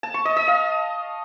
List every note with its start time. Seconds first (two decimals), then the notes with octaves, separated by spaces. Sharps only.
0.03 A5
0.14 C#6
0.25 D#5
0.37 D#5
0.48 F5